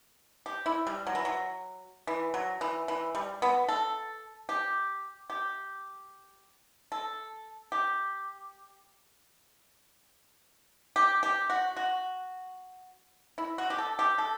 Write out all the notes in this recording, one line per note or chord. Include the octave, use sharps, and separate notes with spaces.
G4
E4
G3
F#3
E3
F#3
E3
F#3
E3
E3
G3
B3
A4
G4
G4
A4
G4
G4
G4
F#4
F#4
E4
F#4
G4
A4
G4
A4